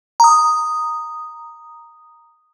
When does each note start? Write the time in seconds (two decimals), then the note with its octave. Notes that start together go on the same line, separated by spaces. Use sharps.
0.20 A#5 D#6